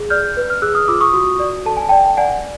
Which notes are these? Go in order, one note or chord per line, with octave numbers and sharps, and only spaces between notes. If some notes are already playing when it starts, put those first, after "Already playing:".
Already playing: G#4
D5 F6 G6
B4
F6
G#4 E6 F#6
D#6 F6
F4 D6 E6
C#6 D#6
F#4
D5
A4 A5
G#5
D5 G5 A5
D5 F#5 G#5